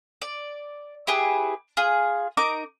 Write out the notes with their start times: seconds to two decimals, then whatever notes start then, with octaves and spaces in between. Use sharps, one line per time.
0.22 D5
1.07 E4 G4 G#4 B4
1.77 F4 G#4
2.37 D#4 A#4 D6